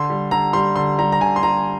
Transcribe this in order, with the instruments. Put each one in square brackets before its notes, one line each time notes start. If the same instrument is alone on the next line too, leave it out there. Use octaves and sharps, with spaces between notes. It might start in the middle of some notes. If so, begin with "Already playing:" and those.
Already playing: [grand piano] D3 C6
G3
D3 A#5
G3 C6
D3 C6
G3 A#5
A#5
D3 G#5
C6
G3 A#5